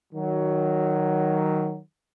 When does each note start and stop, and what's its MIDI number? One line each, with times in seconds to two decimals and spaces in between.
0.13 1.79 51
0.13 1.79 54